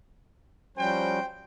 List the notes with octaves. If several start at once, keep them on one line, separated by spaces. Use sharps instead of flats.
F3 G3 C#4 F#4 C5 G5